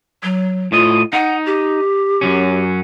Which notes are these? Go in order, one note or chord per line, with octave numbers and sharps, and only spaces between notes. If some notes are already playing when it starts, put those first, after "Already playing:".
F#3
A2 F4 D#5
D#4 F#5
G4
F#2 F#3 C#4